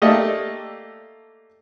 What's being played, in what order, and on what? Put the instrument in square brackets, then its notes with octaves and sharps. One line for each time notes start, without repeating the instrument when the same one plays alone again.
[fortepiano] A3 A#3 G4 A4 D5 D#5